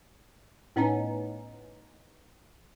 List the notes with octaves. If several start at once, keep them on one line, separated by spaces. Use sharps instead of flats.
A2 B3 C#4 D#4